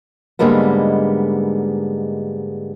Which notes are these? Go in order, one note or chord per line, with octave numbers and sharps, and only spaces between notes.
G#2 D3 G3 G#3 A#3 B3